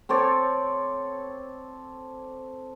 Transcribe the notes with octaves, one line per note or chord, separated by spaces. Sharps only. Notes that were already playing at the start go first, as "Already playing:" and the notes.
C4 A4 C#5 D5